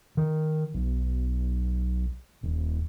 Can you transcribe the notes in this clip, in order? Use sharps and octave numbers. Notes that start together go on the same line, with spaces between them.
D#3
B1
D#1